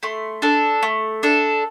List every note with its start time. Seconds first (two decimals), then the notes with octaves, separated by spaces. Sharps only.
0.03 A3 C6
0.42 D4 A4
0.83 A3
1.23 D4 A4